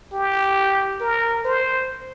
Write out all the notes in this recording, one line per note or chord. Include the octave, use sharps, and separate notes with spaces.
G4
A#4
C5